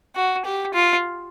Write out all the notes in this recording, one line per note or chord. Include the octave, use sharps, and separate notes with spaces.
F#4
G4
F4